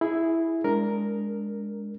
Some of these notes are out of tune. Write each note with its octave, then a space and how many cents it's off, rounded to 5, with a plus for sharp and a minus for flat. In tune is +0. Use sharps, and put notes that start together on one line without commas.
E4 +0 G#4 +0
G#3 +0 D4 -15 A#4 +0